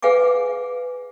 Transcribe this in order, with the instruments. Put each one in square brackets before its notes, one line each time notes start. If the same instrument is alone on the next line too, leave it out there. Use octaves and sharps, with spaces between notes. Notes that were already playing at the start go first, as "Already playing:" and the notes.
[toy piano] G#4 B4 F5 F#5 G#5 D6